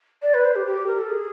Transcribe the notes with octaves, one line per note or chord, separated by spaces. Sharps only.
D5
B4
C5
G4
G4
A#4
A4
G#4